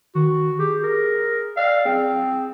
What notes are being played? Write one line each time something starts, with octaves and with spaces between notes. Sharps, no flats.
D#3 F#4
G4 G#4
A#4
D5 F5
C4 G#4